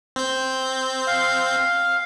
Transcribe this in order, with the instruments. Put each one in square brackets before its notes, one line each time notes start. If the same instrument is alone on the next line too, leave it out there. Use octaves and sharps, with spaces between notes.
[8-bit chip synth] C4 G6
[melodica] F5